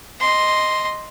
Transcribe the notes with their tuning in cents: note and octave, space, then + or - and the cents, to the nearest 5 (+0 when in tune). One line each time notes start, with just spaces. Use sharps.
D#5 +0 C6 +0